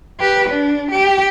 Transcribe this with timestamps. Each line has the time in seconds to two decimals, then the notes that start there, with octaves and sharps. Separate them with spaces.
0.20 G4 B4
0.50 D4
0.91 G4